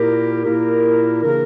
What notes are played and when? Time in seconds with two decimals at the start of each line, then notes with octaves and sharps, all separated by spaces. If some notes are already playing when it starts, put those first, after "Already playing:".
Already playing: A#2 A#3 E4 G4 A#4
0.42 A#2 A#3 E4 G4 A#4
1.21 C#3 E3 A#3 D4 A#4